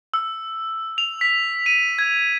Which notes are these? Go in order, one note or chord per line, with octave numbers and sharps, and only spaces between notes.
E6
F7
B6
D#7
G#6